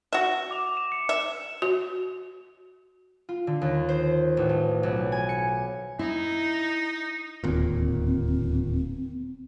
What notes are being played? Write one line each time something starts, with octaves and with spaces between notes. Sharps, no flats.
F#4 E5 E7
D6 F7
E7
C#7
E5
F#4
F4
D3
D#2
C5
A1
A3
B1
G#5
C#7
D#4 E4
D1 D#2 A#2 C4